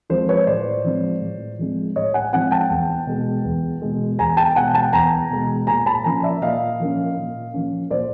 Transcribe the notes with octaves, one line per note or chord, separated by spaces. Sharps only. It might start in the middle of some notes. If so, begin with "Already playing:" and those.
F3 G#3 C4 C5
B4 C#5
A2 C5 D5
F3 G#3 C4
A2
F3 G#3 C4
A2 C#5 D#5
F#5 G#5
F3 G#3 C4 F#5 G#5
G5 A5
E2
B2 G#3
E2
B2 G#3
E2 G#5 A#5
G5 A5
B2 G#3 F#5 G#5
G5 A5
E2 G#5 A#5
B2 G#3
A#2 G#5 A#5
A5 B5
F3 A#3 C#4 G#5 A#5
D5 E5
A#2 D#5 F5
F3 A#3 C#4
A#2
F3 A#3 C#4
A#2 C5 D5